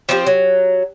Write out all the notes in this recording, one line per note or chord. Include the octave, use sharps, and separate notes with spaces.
F3 C4 D#4 G4
F#3